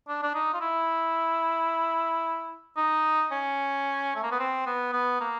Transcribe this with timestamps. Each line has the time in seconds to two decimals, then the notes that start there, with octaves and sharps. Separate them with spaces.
0.08 D4
0.23 D4
0.35 D#4
0.54 F4
0.61 E4
2.77 D#4
3.32 C#4
4.16 A3
4.23 A#3
4.32 B3
4.39 C4
4.66 B3
4.93 B3
5.21 A#3